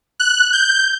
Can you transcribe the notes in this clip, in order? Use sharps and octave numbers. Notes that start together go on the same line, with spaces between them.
F#6
G6